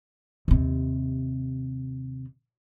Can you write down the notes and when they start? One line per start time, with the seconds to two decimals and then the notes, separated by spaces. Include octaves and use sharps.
0.48 D#2 C3